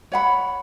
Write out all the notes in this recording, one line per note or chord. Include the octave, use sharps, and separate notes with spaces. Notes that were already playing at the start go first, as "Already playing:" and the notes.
C#5 F#5 B5